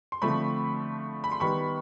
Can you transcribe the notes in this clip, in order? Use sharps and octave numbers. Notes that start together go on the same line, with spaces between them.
C6
D3 F3 A3 C4 B5 C#6
B5
C6
D#3 G3 B3 B5 C#6